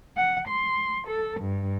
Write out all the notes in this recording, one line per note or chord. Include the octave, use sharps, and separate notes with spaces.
F#5
C6
A4
G2